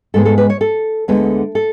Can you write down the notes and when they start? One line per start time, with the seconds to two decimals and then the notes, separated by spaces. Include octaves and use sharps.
0.14 G#2 G#3 B3 A4
0.25 A4
0.38 B4
0.50 C#5
0.61 A4
1.08 D2 D3 G#3 B3
1.55 A4